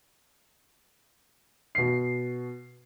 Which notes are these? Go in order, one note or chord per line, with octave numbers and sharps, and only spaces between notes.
B2 C7